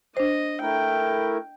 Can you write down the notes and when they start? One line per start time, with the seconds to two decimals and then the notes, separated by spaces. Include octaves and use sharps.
0.17 D4 C5 D#5
0.61 A3 E4 A#4 G5